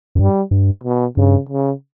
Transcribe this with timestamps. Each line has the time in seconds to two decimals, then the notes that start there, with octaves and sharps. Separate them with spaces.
0.15 F#2
0.19 G2 G3
0.51 G2
0.84 B2
1.17 G2 C#3
1.49 C#3